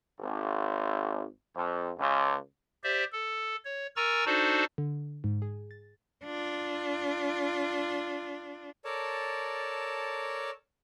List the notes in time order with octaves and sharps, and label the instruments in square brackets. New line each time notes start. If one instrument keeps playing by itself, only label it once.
[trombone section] G#1
F2
C#2
[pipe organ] G4 C5 D5 E5
A4
C#5
A#4 G#5 A#5 C#6 E6 A6
D4 D#4 F#4 A4 C5 D5
[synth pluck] D3
G#2
G#4
A6
[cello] D4 F4
[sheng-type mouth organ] A4 A#4 C#5 D5 A5